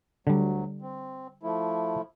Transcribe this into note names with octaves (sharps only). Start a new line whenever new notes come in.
D2 D3 F#3 G3
C4
F3 A3 E4